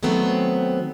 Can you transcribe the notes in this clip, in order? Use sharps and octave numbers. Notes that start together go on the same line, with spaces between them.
D#3 F#3 A3 B3 C4